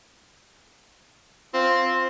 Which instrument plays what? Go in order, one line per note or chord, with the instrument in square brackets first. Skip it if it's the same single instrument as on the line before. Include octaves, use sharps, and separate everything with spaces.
[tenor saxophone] C4 [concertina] F4